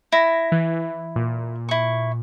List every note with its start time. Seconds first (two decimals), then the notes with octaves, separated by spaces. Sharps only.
0.12 E4 A#6
0.52 E3
1.16 A#2
1.69 E4 C#6